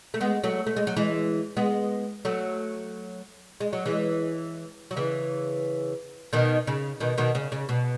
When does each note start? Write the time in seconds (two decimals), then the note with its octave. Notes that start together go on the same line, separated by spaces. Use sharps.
0.14 A3
0.21 G#3 B3
0.44 F#3 A3
0.66 A3
0.76 G#3
0.87 F#3
0.96 E3 G#3
1.57 G#3 B3
2.25 F#3 A3
3.61 G#3
3.73 F#3
3.86 E3 G#3
4.91 F#3
4.97 C#3 E3
6.33 B2 D#3
6.67 C#3
7.00 B2 D#3
7.18 B2 D#3
7.35 C#3
7.52 C#3
7.69 B2